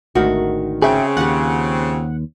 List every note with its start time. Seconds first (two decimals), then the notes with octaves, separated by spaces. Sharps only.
0.15 G#1 D2 D#3 F#4
0.82 C#3 C4 G#4 E5 G5
1.17 D#2 F4 G4 F#5